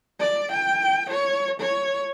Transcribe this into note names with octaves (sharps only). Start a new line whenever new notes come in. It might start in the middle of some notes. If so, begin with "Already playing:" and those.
D5
G5
C#5
C#5